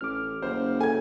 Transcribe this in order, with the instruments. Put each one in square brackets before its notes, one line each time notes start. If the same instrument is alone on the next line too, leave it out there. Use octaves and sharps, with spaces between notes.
[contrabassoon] A1 [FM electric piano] D6 F6
[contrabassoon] F#1 [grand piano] C5
[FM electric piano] A4 [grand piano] G#5 G#6